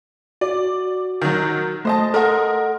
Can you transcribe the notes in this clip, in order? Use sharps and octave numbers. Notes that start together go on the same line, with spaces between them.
F#4 D5
D#3 F#3
A3 C5 D#5 A5
A4 A#4 D#5 F#5 C6